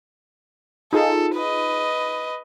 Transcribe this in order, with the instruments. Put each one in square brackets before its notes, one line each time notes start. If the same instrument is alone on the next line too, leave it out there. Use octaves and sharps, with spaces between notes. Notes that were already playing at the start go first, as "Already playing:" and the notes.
[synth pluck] D#4 F4 G#4 [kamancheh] A4
[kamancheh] B4 D#5